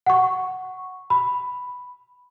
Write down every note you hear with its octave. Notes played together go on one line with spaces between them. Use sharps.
F#5 C#6
B5